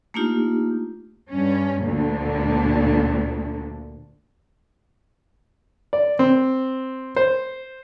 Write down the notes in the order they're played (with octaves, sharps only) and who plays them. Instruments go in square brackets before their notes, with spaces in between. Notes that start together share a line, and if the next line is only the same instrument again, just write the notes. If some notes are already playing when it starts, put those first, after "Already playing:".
[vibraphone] A3 A#3 D4 D#4 F4 G4
[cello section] G2 C#4
D2 A#2 D3
[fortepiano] D5
C4
C5